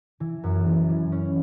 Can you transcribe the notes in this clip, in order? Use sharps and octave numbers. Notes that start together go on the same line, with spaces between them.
E3
F#2
E3
E3
C#4